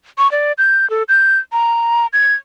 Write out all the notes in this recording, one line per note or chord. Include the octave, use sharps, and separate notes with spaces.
C#6
D5
G6
A4
G6
A#5
G#6